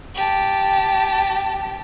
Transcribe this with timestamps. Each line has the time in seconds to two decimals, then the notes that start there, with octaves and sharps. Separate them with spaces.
0.15 G4 A5